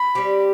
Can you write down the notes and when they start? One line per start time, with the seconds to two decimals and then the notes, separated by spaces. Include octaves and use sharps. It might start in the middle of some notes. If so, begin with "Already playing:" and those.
Already playing: B5
0.15 G3 C4 G4